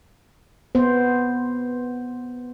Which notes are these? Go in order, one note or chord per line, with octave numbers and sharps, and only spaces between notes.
B3 C5